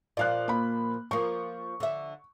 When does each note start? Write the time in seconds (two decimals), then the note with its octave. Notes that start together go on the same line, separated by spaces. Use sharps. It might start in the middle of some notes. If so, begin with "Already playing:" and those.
0.17 A#2 F3 D5 F5 F#6
0.48 A#3 B5
1.11 F3 A#3 C#6
1.80 D3 E5